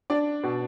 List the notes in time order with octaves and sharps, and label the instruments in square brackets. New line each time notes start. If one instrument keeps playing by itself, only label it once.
[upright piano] D4 D5
B2